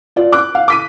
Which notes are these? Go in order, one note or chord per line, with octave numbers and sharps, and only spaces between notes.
F4 D5
D6 F#6
F5
D6 B6 D#7